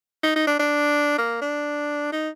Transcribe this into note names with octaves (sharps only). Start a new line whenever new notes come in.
D#4
D#4
D4
D4
A#3
D4
D#4